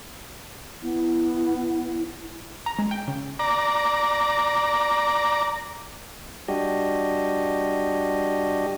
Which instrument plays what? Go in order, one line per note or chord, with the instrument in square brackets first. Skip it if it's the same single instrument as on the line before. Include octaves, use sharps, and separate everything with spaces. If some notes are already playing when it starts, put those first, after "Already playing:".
[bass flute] B3 [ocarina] E4
[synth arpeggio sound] A#5
G#3
G5
C#3
[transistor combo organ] D5 A#5
[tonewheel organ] G3 D4 F#4 G4 D#5